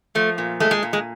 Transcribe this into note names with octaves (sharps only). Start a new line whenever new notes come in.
F3 A3
A#2
G#3 A3
G#3
A#2
G#3